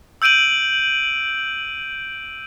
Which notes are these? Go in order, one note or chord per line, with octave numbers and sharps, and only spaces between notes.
E6 G6 D7 D#7 F#7